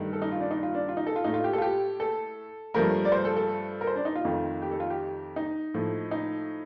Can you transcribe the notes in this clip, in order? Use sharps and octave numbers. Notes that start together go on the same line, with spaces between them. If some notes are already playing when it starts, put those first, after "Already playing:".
Already playing: G2 D#3 A3
A4
D#4
F4
D4
D#4
F4
D4
F4
D#4
A4
F4
A2 A3 D#4
F4
G4
A4
F4
G4
A4
G2 F3 A3 A#4
D5
C5
A4
A4
A#4
C5
D4
D#4
F4
F2 D#3 A3
G4
A4
F4
G4
D#4
A2 F3 A3
D#4